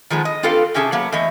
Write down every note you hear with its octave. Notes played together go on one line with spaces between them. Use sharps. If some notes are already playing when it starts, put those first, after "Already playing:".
D#3 F3 G#3 B3
D#5
C4 F4 G4 A4 B4 F5
C3 C#4 G4 G#4 E5 A5
F#3 A#3 B3
E2 A3 D#5 E5